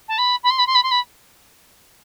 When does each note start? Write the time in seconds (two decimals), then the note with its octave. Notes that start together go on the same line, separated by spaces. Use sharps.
0.08 A5
0.18 B5
0.43 B5
0.50 C6
0.58 B5
0.67 C6
0.75 B5
0.83 C6
0.91 B5